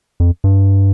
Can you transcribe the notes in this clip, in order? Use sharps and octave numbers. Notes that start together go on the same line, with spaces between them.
F2
G2